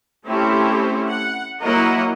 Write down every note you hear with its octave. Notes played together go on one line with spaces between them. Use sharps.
A3 C4 C#4 E4 G4 C5
F#5
F#3 A#3 E4 A#4 D#5 F#5